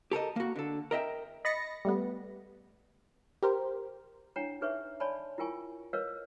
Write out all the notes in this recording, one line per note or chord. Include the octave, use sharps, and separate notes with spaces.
G4 A4 A#4 D#5
A#3 F#4
D3 A4
A#4 D#5 E5 G5
D#5 B5 A6 A#6 C#7
G3 A3 B3
G4 A#4 C5
D4 E4 C#5 F#5 G5 A#5
D#4 G#4 B4 C#5 E5 C#6
C#5 D5 G#5 A5 B5 C6
E4 F4 A#4 G5 G#5 C#6
A#4 B4 C#5 D#5 F5